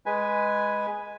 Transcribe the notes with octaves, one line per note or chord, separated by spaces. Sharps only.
G#3 B4 G#5